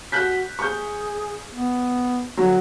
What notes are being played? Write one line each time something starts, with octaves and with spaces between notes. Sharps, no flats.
F#4 F#6 G6 B6
G#4 C#6 G6
B3
D3 F#3